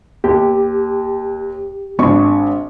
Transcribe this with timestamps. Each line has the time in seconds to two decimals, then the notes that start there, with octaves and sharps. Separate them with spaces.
0.24 D#2 G4
1.99 G#1 D4 C#6